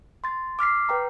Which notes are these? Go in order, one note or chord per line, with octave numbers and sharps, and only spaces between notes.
C6 A6
D6 F6 B6 C7
B4 G5 A#5